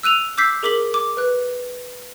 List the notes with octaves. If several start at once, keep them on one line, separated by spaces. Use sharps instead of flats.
E6 F#6 D#7 F7
D6 E6 G6 B6 C7
G#4 A#4 D6 B6 F#7
D6
B4 F#6